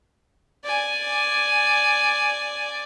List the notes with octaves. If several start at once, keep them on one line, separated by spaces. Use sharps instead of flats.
D5 G#5